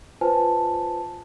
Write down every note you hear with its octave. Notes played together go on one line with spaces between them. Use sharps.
F4 B4 C5 G#5 A5